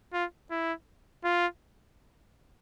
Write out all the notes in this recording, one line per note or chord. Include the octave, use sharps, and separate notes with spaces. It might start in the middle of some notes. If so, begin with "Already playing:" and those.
F4
E4
F4